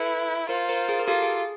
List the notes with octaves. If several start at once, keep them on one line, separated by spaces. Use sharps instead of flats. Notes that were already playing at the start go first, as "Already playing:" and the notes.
Already playing: E4 A4 B4
F4 A#4 C5
A#4 C5
G#4 A#4
A#4
F4 G4 A4
G#4